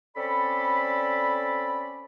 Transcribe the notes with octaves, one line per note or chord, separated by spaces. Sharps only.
C4 C#4 A4 D5 B5